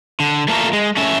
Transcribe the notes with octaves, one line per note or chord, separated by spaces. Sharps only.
D3
A3 A#3 F4 A4 A#4
G#3
A3 C#4 E5